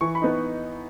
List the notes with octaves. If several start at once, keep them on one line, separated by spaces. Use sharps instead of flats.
E3 C#6
B5
B3 D#4